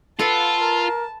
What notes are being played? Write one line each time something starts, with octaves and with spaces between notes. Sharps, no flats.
F4 A4 B4 F#5 A5
A#4